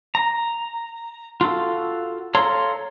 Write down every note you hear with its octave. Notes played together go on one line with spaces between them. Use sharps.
A#5
F4 F#4 A4 F5
A4 C#5 F5 A#5 C6